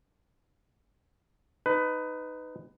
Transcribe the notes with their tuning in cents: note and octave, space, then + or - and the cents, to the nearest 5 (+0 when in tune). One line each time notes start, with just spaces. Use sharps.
D#4 +0 B4 +20